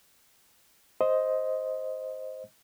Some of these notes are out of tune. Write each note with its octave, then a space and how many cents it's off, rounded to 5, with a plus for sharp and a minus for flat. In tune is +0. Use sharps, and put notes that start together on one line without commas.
C5 +0 D#5 +10